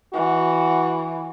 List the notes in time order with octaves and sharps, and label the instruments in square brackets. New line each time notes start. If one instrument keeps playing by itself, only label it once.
[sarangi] E3 [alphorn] F#4